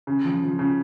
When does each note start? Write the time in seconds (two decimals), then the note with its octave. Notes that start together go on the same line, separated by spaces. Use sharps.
0.07 C#3
0.25 F3
0.42 F3
0.59 C#3